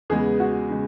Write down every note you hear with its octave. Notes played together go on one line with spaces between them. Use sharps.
E2 C#3 G#3 B3 G#4
F#4
C#3 G#3